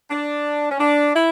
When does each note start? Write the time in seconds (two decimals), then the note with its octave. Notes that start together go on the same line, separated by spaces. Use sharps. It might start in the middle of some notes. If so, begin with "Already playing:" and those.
0.10 D4
0.71 C#4
0.80 D4
1.16 E4